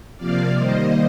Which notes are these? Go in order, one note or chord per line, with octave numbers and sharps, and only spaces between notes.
C3 F3 A#3 D5 F5
D#3 G3 A#3 C5 D#5